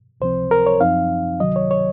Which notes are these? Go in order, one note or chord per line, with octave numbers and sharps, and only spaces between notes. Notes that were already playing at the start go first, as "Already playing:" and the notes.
C#2 C3 F3 C4 C5
A#4
C#5
F#2 F3 C4 D#4 F5
C#2 C3 D#3 F#3 D#5
C#5
C#5